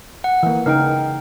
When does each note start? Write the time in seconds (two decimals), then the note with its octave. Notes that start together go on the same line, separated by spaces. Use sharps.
0.24 F#5
0.43 E3 A#3
0.66 C#3 D#4 A#4 G5